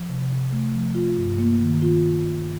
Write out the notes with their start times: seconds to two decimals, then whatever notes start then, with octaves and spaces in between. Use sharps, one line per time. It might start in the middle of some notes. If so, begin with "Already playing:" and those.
Already playing: F3
0.09 C3
0.30 C3
0.52 A3
0.74 F3
0.95 F4
1.17 G2
1.38 A#3
1.61 D#3
1.82 F4